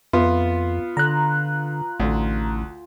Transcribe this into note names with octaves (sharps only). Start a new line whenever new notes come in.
F2 B3 F4
D3 A#5 F#6
A1 D2